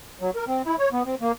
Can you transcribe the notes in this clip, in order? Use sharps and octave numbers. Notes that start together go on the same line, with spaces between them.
F#3
A#4
C4
E4
C#5
B3
C4
A#3